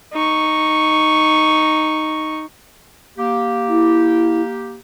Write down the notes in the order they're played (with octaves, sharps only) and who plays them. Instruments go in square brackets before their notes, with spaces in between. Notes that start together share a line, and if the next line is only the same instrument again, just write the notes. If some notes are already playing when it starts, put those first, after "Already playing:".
[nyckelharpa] D#4 C#6
[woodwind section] A#3 G4
[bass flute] E4